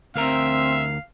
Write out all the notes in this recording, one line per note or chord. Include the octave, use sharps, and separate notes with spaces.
D2 C4 A#4 E5 F5 A#5